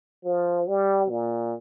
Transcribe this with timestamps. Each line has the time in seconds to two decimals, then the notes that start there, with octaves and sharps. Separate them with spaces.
0.25 F3
0.67 G3
1.10 A#2